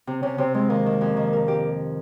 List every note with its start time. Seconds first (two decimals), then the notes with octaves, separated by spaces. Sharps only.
0.07 C3
0.23 C3 C#4
0.38 C3 C4
0.54 G#3 C4
0.70 D#3 A#3
0.86 D#3
1.01 F2
1.17 D#3
1.33 A#4
1.48 G4